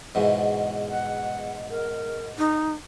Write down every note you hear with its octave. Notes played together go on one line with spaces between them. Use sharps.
E2 G#2 B2
F#5
A#4
D#4